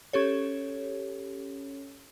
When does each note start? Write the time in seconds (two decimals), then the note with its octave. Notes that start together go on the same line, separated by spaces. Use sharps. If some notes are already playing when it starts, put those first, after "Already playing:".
0.13 C#4 G4 A4 C#5